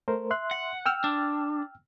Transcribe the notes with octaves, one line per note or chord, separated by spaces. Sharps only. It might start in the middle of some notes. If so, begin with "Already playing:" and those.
A3 A#4 C5
E5 C6 F#6
F#5
G5 E6 F6
D4